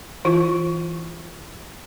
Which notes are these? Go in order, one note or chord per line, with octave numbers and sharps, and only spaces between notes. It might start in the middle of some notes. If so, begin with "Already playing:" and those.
E3 E4 F4